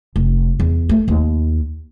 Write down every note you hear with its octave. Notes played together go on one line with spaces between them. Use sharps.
F1
E2
A3
D#2